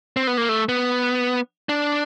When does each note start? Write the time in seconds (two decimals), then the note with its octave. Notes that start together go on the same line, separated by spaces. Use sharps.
0.17 C4
0.27 B3
0.38 A#3
0.49 A3
0.69 B3
1.69 D4